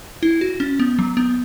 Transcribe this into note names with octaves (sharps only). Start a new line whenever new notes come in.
E4
F#4
C#4
B3
F#3
B3